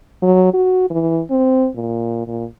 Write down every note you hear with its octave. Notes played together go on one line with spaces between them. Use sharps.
F#3
F#4
E3
C4
A#2
A#2